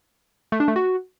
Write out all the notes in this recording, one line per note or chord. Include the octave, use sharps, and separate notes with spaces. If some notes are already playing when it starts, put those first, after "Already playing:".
A3
D4
A3
F#4